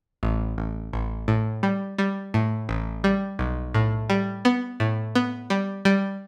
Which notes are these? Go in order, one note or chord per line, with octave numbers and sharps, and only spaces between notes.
A1
A1
A1
A2
G3
G3
A2
A1
G3
B1
A2
G3
B3
A2
B3
G3
G3